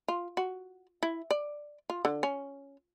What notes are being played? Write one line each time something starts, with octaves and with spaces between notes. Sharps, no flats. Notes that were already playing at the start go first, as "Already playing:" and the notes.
F4
F#4
E4
D5
F4
D3
C#4